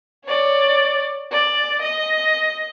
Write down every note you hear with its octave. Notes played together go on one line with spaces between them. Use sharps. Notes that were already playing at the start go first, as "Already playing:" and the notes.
C#5 D5
D5
D#5